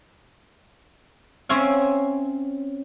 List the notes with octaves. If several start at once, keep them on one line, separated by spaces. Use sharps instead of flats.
C4 C#4 C#5 E5 F5